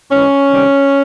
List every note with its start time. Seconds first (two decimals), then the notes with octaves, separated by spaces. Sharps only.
0.12 G#2 E3 G#3 C#4
0.50 C3 D#3 G3